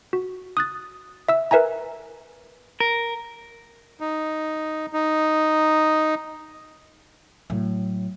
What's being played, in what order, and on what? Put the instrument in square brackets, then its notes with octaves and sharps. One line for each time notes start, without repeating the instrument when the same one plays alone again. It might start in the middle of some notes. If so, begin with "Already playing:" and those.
[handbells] F#4
D#6 F#6 A6
E5 E6
A#4 B4 E5 G#5 A#5
[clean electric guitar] A#4
[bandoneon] D#4
D#4
[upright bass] A2 F#3